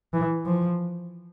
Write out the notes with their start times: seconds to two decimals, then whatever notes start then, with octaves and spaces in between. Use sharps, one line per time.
0.13 E3
0.46 F3